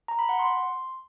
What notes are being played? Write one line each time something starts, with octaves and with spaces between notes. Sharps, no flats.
A#5
B5
F#5
C6